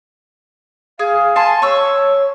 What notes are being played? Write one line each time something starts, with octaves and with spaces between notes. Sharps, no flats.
G#4 F5
G#5 A5 C6
C#5 C#6 E6